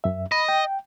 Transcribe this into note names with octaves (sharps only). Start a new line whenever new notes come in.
F#2 E5
D#5 B5
G5